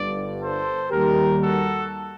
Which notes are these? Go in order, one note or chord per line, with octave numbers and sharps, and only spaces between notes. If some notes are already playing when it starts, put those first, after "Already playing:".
Already playing: G1 G2 D3 D5
A4 C5
D#2 D#3 G3 G4 A#4
F#4 A4